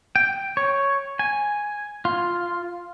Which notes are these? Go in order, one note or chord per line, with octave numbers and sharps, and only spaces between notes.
G5
C#5
G#5
F4